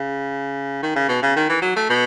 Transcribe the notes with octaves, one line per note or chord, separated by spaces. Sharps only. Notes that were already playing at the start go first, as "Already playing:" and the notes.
Already playing: C#3
D#3
C#3
B2
C#3
D#3
E3
F#3
A3
B2